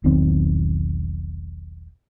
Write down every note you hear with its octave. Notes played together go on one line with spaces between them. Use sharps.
E1 B1 D#3 C4